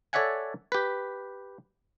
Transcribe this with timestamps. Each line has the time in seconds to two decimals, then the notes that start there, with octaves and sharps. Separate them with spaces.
0.13 A4 C#5 D5 E5 F#5 G#5
0.72 G4 B4